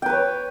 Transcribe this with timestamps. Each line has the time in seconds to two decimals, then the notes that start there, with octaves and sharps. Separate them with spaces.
0.02 G5
0.06 B4
0.10 C#5